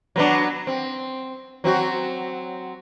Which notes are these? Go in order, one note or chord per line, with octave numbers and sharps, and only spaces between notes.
F#3 B3 D4
C4
F#3 C4 F#4